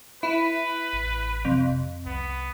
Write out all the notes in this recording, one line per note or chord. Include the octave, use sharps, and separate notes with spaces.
E4 B4
A1
F2 C3
C2 B3